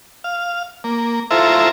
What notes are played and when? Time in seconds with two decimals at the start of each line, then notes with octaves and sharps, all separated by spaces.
0.24 F5
0.84 A#3
1.31 E4 F4 A4 C5 E5 A#5